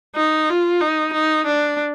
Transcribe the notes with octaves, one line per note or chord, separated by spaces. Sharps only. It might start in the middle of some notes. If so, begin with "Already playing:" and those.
D#4
F4
D#4
D#4
D4